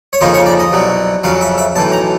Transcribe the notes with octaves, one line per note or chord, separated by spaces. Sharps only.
C#5
F2 C#3 F3 A#3 D#4 C5
C#5
D5
D#5
C2 B2 F#3
F2 C#3 F#3 F5
E5
E5
B1 A2 E3 A5
A#5